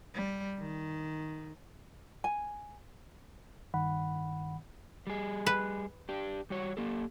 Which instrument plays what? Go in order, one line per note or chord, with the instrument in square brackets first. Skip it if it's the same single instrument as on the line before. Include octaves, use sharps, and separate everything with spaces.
[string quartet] G3
D#3
[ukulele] G#5
[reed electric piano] G2 D#3 F#5 B5
[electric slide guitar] G3 G#4
[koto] B4
[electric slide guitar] D4 G4
G3 F#4 C#5
A#3 G4 A4